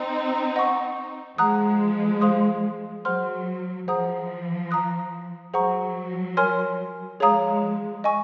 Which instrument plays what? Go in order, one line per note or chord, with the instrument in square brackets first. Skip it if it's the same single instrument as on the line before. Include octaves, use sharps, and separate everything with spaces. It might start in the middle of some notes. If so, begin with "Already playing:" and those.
Already playing: [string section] C4 D#4
[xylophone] D#5 F#5 C#6
[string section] F3 G#3 [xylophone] F#5 A#5 D#6 F#6
[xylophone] G#4 C5 F5 C6 D#6
[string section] F#3 [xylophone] G#4 C5 F#5 C6 F6
[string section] F3 [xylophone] G#4 C5 F#5 A#5 D#6
[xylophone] F5 A#5 D#6 F#6
[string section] F#3 [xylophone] G#4 C5 F#5 A#5 C#6
[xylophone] A#4 C#5 G#5 C6 F6
[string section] F3 G#3 [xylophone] G#4 C#5 F5 A#5 D#6
[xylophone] D#5 G#5 C#6